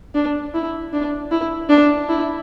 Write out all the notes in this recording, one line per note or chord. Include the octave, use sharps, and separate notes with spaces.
D4
E4
D4
E4
D4
E4